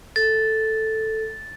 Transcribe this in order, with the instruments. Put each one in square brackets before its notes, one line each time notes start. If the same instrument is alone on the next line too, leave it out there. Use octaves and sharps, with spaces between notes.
[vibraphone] A4 [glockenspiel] A6